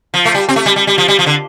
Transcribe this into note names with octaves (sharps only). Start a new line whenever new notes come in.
F3
A3
G3
C4
A3
G3
G3
G3
F3
G3
F3
D3